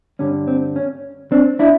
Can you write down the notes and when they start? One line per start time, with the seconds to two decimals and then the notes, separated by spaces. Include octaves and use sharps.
0.19 G2 D3 G3 C#4
0.47 C4
0.76 C#4
1.32 C4 D4
1.59 D4 E4